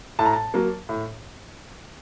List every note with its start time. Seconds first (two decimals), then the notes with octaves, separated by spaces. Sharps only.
0.19 A2 A5
0.25 A#5
0.33 A5
0.54 F#3 A#3
0.89 A2